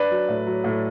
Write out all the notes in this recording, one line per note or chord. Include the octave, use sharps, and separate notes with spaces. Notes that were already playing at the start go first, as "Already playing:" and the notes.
Already playing: D4 B4 D5
F#3
A2
F#3
A2